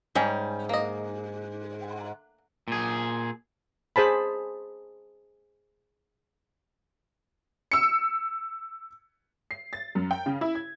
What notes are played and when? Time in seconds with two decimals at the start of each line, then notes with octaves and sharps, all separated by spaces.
0.15 G#2 G3 C#4
0.69 A#3 D#5
2.68 A#2 G#4
3.96 G#4 C5 A5 B5
7.72 E6 C#7
9.51 C7
9.73 A6
9.95 F#2
10.11 G5
10.26 C#3
10.41 E4
10.55 G#6